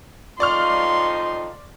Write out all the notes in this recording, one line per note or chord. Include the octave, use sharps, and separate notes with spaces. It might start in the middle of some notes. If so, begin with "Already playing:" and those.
F2 D#4 F4 D5 C6 C#6 F6